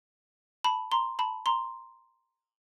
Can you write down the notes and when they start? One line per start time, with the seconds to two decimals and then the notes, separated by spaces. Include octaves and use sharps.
0.64 A5 B5
0.92 A#5 C6
1.19 A5 B5
1.46 A#5 C6